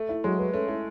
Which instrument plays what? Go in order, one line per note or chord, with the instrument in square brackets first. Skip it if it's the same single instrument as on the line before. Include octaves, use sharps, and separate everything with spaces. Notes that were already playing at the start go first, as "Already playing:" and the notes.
Already playing: [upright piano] A3
[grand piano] E4
[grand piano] F#3 [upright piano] G#3
[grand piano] B4
[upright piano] A3 [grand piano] C#4
[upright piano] A3 [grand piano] E4